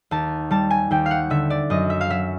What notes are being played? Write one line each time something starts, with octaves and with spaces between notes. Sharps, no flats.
D#2 A5
G3 A5
G#5
D#2 G5
F5
F#5
D3 E5
D5
F#2 D#5
E5
F5
F#3 E5